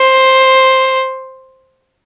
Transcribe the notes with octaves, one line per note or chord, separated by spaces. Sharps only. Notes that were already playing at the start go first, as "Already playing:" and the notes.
Already playing: C5